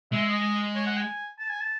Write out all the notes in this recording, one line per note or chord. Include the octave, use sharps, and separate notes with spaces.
G#3 E5
D#5
C#5
F#5
G#5
A5
G#5
A5